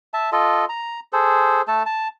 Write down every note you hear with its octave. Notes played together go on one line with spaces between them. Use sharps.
E5 A5
F4 A4 D#5
A#5
G#4 A4 C5
A3 A4 A5
A5